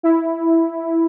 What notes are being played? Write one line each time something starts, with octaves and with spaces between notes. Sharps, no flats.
E4